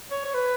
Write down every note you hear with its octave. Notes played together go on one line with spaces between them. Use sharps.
C#5
C#5
B4